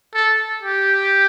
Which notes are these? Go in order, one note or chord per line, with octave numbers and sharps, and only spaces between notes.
A4
G4